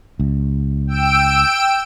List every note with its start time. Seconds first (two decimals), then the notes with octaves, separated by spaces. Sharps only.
0.20 C#2
0.87 G5 E6 D7